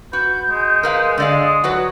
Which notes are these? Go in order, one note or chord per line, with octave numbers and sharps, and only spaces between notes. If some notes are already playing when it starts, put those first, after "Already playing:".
F#4 B4 G6
G#3
A#4 B4 F5
D3 G#3 D5 F5
D#6
F#3 F#4 B4 F#5